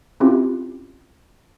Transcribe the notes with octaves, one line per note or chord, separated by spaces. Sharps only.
C4 C#4 E4 F4 G4